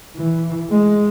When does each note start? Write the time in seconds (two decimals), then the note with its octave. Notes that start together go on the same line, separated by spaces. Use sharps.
0.17 E3
0.70 G#3